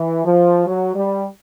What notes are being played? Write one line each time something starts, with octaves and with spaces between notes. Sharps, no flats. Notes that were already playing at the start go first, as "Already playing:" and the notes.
Already playing: E3
F3
F#3
G3